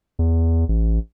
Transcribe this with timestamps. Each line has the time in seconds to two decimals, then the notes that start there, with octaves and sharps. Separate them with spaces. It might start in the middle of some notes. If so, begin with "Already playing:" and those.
0.19 E2
0.69 A1